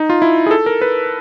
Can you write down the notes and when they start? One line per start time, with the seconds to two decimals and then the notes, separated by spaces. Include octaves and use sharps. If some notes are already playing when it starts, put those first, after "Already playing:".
Already playing: D#4
0.10 F4
0.22 E4
0.46 G#4
0.51 A4
0.66 A#4
0.82 B4